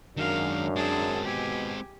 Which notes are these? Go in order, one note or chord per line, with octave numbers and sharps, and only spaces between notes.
F#2 D#3 G#3 D4 A#4 F5
G#3 C4 G#4 A5
B2 G4 G#5